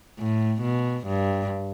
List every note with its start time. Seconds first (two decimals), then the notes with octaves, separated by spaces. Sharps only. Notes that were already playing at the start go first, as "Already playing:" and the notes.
0.18 A2
0.62 B2
1.07 G2